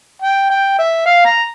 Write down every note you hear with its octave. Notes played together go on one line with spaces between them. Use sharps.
G5
G5
E5
F5
A#5